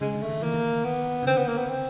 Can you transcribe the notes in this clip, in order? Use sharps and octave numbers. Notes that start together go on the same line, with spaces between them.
C#3 G#3
D3
A3
D#3
E3 A#3
D#3
B3
C#3
D3 C4
B3
A#3
B3
C4